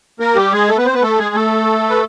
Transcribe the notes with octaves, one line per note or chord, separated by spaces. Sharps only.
A#3 A#4
G3 G4
G#3 G#4
A3 A4
B3 B4
C4 C5
B3 B4
A3 A4
G#3 G#4
A3 A4
B4